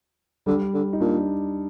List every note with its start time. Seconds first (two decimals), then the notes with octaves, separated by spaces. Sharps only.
0.46 D3 G3
0.74 D3
0.93 D#4
1.01 A#2 D4